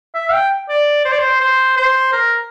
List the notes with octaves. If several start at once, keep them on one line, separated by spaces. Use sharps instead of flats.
E5
G5
D5
C5
D5
C5
C5
C5
A#4